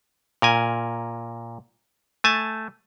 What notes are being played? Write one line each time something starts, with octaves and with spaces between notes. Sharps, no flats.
A#2 A#4 G#5
A3 G#5 A5